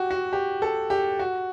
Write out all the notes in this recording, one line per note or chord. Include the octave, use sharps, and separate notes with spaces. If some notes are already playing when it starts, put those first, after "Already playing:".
Already playing: F#4 G4
F#4
G4
A4
G4
F#4